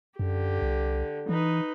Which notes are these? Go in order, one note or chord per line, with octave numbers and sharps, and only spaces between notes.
F#2 D3 G4
C2
E3 D#4 B4